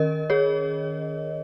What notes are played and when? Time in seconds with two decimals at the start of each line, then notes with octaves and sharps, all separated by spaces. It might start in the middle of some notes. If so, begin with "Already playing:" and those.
Already playing: D#3 C#4 A#4 D#5
0.30 G#4 C#5